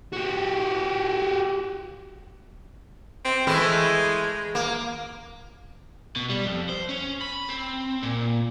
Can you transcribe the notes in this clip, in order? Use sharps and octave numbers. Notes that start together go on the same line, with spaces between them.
F#4 G4
C4
E3 G#3 A3 E4
A#3
B2
G3
F2
C5
C#4
B5
C4
A#2